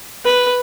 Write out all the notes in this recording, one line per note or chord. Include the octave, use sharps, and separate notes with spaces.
B4